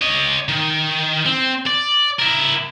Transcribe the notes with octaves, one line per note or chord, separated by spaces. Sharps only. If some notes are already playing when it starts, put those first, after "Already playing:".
C#5 D#5
D#3
C4
D5
E4 A#4